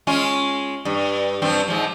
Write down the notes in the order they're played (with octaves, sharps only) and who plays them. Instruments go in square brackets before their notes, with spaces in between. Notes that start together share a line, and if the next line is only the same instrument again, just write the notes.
[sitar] G#3 C#4 F4
G2
G2 F3 C4
G#2 F3